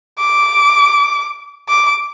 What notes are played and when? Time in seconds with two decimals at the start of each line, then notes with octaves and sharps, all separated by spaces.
0.19 D6
1.69 D6